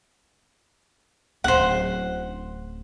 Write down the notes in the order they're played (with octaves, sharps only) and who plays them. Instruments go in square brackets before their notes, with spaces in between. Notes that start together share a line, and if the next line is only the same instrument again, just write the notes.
[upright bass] D1 C#4 [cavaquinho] C5 F#5